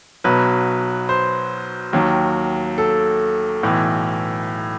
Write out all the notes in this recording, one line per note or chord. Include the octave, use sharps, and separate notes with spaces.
B1 B2 F#3 B4
C5
D#2 D#3 F#3
A4
B1 A2 E3